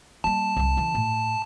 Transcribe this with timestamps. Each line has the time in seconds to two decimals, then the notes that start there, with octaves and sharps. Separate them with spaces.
0.24 G3 A#3 A5
0.56 C2 G3
0.77 C#3 E3
0.95 A2